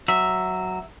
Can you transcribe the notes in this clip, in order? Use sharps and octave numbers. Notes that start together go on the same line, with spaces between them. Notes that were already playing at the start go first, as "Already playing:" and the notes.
F#3 E5